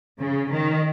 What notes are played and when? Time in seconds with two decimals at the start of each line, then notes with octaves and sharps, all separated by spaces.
0.18 C#3
0.52 D#3